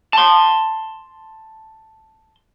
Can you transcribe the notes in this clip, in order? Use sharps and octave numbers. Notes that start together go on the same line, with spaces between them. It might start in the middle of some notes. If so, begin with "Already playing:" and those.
A5 C6